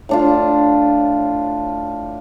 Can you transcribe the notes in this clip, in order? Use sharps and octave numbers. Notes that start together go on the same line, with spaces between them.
A2 D4 F4